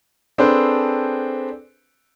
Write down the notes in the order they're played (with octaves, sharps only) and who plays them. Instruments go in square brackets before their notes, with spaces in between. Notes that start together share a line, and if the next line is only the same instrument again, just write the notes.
[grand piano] C4 D4 G#4 A4 B4 C5